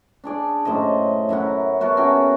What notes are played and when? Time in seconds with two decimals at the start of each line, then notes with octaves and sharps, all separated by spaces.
0.24 D4 G#4 D5
0.65 F#2 A2 C5 D#5
1.29 F#2 E4 A#4 F#5
1.81 B3 F#4 A4 A#4
1.97 C#4 F#4 G#4 G5